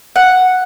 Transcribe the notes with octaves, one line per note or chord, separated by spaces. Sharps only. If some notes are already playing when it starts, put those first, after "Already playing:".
F#5